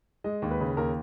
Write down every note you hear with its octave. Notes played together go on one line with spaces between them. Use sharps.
G#3 D#5
D#2
B4
C#3
D#2 A#4